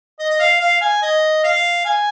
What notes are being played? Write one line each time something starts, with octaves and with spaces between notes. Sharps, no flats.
D#5
D#5
F5
F5
G#5
D#5
F5
G#5